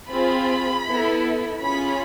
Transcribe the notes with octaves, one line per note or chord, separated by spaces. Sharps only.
C4 F4 G#4 B5
B3 E4 A4
C#4 F4 G#4 B5